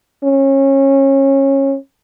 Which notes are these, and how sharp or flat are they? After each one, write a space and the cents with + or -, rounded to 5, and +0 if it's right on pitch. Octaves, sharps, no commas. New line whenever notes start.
C#4 -25